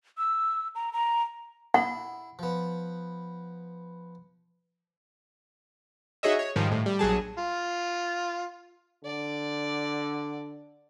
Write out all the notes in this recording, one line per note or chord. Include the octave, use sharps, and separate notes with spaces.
E6
A#5
A#5
E4 F#5
F3 B3
D#4 F#4 G#4 C#5 D#5 E5
C#5
G#2 D#3 F3 G3
A2
G3
A#1 F#3 G#4 A5
F4
D3 D5